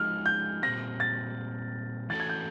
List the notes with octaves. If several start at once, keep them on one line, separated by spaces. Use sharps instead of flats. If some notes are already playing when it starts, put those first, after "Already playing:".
Already playing: F3 G#3 D#4 G#4 F6
G6
A#2 G3 C4 A#6
A6
E3 A3 C#4 F#4 A4 A6
G#6
G6